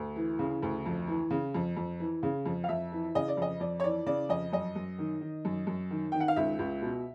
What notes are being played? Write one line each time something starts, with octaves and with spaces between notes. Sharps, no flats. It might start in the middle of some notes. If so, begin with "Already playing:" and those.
Already playing: D2
E3
C#3
D2
F2
E3
C#3
F2
F2
E3
C#3
F2
F5
F2 E5
E3
C#3 D#5
D5
F2 D#5
F2 D5
C#5
E3 D5
C#3 D5
F2 D#5
F#2 D#5
F#2
D#3
D#3
F#2
F#2
D#3
D#3 G5
F#5
F5
C#2 E5
C#2
B2